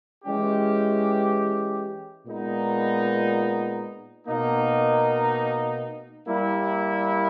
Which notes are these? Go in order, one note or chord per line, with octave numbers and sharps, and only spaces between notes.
E3 G#3 C#4 G4
A#2 G#3 B3 D#4
B2 A#3 D#4
G3 A#3 E4